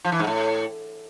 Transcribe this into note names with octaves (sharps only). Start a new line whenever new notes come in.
F3
E3
G#2
A2